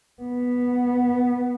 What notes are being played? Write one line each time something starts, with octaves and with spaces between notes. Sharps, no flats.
B3